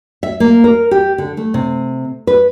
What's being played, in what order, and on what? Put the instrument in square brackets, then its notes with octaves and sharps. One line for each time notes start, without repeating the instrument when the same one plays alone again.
[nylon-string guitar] E5
A#3
A#4
G4
D3
A3
C3
B4